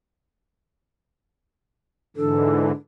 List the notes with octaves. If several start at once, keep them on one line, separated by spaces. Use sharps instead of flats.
G#2 D3 E3 D4 A4